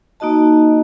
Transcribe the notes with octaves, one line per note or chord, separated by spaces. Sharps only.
A#3 D#4 F#4 D#5 A5